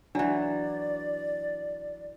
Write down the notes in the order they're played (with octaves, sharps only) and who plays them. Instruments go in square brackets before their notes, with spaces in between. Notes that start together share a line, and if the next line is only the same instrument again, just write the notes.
[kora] E3 F#3 [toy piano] D4 [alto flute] D5